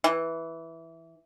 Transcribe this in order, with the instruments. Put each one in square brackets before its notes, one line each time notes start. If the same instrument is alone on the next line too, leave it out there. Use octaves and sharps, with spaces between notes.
[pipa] E3